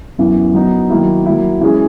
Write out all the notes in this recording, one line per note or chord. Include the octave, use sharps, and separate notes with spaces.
F#2 E3 B3
F#3 B3 D#4
D#3 F#3 A#3 E4
F#3 A#3 E4
E3 G#3 C#4 G#4